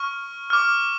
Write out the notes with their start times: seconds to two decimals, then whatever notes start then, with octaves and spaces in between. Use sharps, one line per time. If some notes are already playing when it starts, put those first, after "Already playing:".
Already playing: C#6 F6
0.50 D6 F6